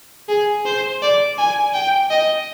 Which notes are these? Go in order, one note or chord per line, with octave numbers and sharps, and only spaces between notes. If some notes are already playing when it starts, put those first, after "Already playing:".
G#4
C5
D5
G#5
G5
D#5